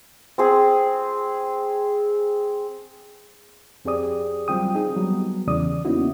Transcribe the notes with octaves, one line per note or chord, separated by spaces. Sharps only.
C4 G#4
F2 C4 G4 G#4 D5 D#6
F#3 G3 C4 F4 G5 D#6
C4 D#4 G#4
F#3 G3 B3
E2 C#3 D5 D#6
A#3 B3 C#4 D#4 E4 F#4